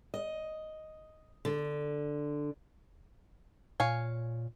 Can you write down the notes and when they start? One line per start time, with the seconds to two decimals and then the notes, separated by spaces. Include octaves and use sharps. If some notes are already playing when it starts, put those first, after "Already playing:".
0.14 D#5
1.45 D3
3.80 A#2 C#5 F5 G#5